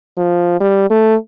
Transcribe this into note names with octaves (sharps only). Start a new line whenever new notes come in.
F3
G3
A3